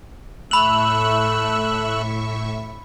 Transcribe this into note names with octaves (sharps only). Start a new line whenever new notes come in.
A2 A3 E5 B5 C#6 E6 F#6 F#7